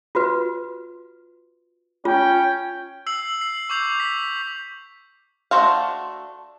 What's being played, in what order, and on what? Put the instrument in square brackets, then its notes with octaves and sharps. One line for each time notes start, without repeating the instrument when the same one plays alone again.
[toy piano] F4 F#4 B4
[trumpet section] C#4 G5 [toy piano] F4
[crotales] E6 C7 F#7
C7
C#6 D6 G6 C7 F7
B6
[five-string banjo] A3 D4 F#4 C5 F5